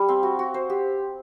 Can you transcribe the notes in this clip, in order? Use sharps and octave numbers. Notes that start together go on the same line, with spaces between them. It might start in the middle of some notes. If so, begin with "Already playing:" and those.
Already playing: G3
C4
F#4
F#4
C5
G4